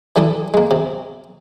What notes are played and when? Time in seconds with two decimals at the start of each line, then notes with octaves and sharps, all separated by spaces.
0.16 E3 G3 A4 D#6
0.54 G#3 A#3
0.71 C3